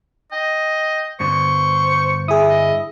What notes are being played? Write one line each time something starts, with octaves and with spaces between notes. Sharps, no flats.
D#5 G5
G2 D3 B3 C5 C#6
E4 G#4 D#6
D#5